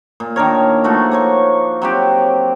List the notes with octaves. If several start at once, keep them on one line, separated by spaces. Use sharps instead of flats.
A#2
D#3 D4 A#4 C#5
F3 A3 D#4 F#4
A#3 C#5 C#6
F#3 C4 G4